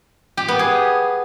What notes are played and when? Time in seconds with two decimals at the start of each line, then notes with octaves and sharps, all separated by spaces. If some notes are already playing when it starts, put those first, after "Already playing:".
0.37 G4
0.48 B3
0.59 G#4